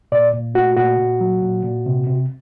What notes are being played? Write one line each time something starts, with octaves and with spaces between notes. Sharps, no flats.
A#2 D5
A#2
A3 F#4
A#2 F#4
A#2
F#3
A#2
A#2
C3
C3